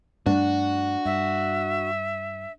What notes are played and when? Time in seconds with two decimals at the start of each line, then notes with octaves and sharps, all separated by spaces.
0.26 G2 G3 A3 D4 F#4
1.05 G2 E5